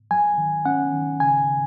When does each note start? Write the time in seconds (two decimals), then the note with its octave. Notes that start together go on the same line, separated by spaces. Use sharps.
0.11 F#3 G#5
0.38 D#3
0.65 C#4 F#5
0.93 D#3
1.20 C#3 G#5
1.48 C#3